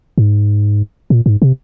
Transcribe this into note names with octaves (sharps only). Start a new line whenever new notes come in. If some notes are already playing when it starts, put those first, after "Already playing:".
G#2
A#2
G#2
C3